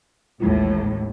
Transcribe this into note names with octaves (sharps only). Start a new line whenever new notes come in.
A1 D#2 A2 G#3 E4 F4